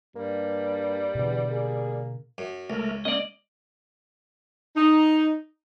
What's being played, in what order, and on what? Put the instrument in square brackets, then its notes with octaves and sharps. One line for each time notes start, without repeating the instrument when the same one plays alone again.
[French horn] G2 [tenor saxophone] G3 [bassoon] A#3
[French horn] E2 [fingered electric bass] B2 D3
[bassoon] A#3 [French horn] G#4
[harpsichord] F#2
[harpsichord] C#2 [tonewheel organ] A3 A#4
[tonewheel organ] A#3 C#4 [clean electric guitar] D5 D#5
[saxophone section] D#4